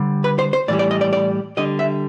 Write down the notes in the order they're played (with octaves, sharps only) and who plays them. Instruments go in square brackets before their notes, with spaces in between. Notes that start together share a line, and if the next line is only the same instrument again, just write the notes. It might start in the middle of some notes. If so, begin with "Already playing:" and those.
Already playing: [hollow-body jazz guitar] D3 G3
B4
C5
C5
A2 E3 G3 D5
D5
D#5
D5
D5
D3 G3 D#5
E5